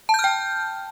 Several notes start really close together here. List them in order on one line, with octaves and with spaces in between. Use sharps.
A5 G6 F6 G5